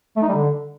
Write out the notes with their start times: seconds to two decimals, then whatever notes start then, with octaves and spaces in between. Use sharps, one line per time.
0.16 A3
0.22 D#4
0.28 G3
0.35 D3